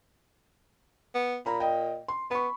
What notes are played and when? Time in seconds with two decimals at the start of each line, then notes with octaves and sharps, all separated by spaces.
1.15 B3
1.46 A#2 A#5 B5
1.60 D#5 G5
2.08 C6
2.31 B3 B5 C#6